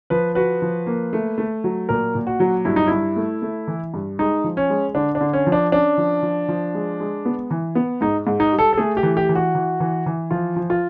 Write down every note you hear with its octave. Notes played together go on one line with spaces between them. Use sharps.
F3 B4
F#4 B4
F3
A#3
A3
A3
F#3
A#2 A#4
A#2
F#4
F#3
G2 E4
D#4
G2 E4
A3
A3
E3
G2
G#3 D#4
F3
C#4
G#3
D3 D4
D4
D3
C#4
F3
D4
C#4 D4
F3
F3
F3
G#3
G#3
B3
E3
B3
G#2 D#4
G#2
D#4
G3
A4
A4
A3 G#4
G4
E3
G4
E3
F#4
E3
E3
E3
F3 F4
F3
F4